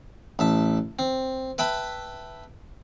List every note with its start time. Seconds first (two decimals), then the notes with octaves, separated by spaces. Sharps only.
0.39 A1 E5 A5
0.99 C4
1.58 B4 E5 G5 A5 B5